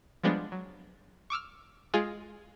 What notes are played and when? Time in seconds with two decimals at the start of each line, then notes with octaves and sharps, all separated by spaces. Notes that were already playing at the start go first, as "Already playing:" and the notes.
0.24 F3 G3 G#3 B3 D4
0.52 F#3
1.30 C#6 D6 E6 F6
1.94 G#3 F4 G#4